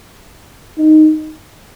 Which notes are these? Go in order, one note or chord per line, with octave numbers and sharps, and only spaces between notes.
D#4